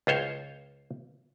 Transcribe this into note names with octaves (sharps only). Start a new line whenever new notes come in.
C#2 F4 C5 C#5